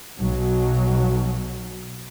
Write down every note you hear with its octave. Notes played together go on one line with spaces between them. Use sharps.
B1 B2 F#3